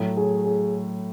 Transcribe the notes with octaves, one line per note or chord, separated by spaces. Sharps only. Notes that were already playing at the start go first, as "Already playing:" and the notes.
Already playing: A2 F#3 A3
G#4
G#4